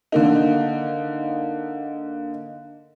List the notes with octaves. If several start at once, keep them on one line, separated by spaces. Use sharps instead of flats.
D3 A#3 D#4